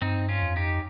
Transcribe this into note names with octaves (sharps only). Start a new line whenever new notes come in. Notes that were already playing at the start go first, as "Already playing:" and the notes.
G2 C4 D#4
C#4 F4
F2
D#4 G4